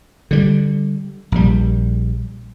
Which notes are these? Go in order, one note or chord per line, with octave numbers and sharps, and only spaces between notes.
D3 G3
A#1 G3